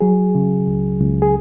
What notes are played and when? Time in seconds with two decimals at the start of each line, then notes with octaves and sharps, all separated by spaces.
0.01 F#3 G#4
0.35 C#3
0.67 C#2
1.00 C#2
1.22 G#4